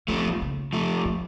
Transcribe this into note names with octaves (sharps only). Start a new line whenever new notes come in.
F3 A3 C#4
C4
A#3
F3
C#3
F3 A3
F3